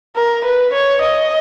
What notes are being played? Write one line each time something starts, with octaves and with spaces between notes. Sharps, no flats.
A#4
B4
C#5
D#5